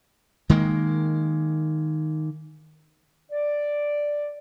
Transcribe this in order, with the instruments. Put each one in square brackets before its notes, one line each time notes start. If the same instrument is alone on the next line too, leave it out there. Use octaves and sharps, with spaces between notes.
[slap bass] D#3 G#3 A#3
[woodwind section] D5